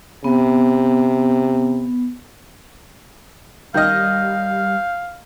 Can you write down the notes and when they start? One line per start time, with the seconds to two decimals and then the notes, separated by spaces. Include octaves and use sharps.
0.24 C3 B3
3.74 D#3 G3 D#5 F5 F6 G6